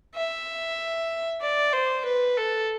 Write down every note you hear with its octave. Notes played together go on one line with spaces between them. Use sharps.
E5
D5
C5
B4
A4